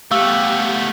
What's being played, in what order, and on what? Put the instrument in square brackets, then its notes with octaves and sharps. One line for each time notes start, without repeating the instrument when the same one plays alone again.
[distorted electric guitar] A3 B3 [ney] G4 [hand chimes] F5 C#6 E6